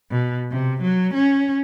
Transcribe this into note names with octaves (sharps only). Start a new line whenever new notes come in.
B2
C3
F#3
C#4